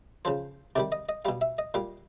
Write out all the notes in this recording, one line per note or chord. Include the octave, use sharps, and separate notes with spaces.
C#3 F3 C5
C3 D#3 G3 D5
D#5
D#5
B2 G3 F5
E5
D#5
A#2 G3 F5